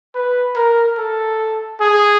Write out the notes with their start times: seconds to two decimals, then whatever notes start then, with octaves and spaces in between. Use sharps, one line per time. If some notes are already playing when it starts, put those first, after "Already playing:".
0.14 B4
0.55 A#4
0.98 A4
1.80 G#4